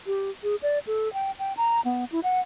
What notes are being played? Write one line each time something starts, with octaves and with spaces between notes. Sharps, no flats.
G4
G#4
D5
A4
G5
G5
A#5
B3
E4
F#5